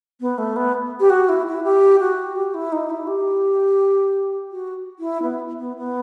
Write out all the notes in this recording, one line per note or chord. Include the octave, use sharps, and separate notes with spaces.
B3
A3
B3
G4
F#4
E4
E4
G4
F#4
G4
E4
D#4
E4
G4
F#4
E4
B3
B3
B3